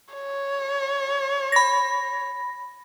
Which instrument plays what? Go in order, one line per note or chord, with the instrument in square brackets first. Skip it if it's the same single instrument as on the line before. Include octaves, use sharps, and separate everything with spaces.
[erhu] C#5
[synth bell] B5 A#6